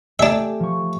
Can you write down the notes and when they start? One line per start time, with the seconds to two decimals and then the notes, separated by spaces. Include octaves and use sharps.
0.19 A3 D4 G4 E5 G#5
0.60 F3 C#6